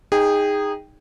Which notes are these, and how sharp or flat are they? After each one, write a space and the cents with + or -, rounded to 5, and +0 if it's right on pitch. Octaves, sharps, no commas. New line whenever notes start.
D#4 +5 G#4 -20 G5 +0